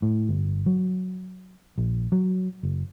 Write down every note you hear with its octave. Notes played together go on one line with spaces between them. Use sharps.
A2
G1
F#3
A#1
F#3
F#1